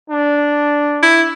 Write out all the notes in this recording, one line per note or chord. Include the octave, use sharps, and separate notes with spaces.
D4
E4